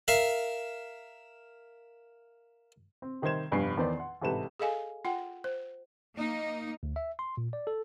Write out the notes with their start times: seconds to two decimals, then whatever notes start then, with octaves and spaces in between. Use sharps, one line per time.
0.08 A#4 E5 F5
3.02 C4
3.22 C3 D#3 G3 C5 G#6 E7
3.51 F1 G2 B3 G#5 C7
3.77 E2 D#3 B3 C5 D5
3.97 F#5 C6
4.22 A1 G#2 C3 A4 B4 E7
4.59 G#4 A4 D#5 F5 G#5
5.05 F4 F#5 G5
5.44 C5
6.16 A#3 D#4
6.83 D2
6.96 E5
7.19 C6
7.37 A#2
7.53 D5
7.67 A4